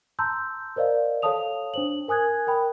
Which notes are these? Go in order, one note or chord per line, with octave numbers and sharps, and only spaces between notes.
A5 A#5 C6 E6 G6
A#4 C5 D5 D#5 F5
A4 C#5 F5 A5 D#6 F7
D4 C5 F#7
A#4 G#5 D#6 F#6 G#6
A#4 G5 B5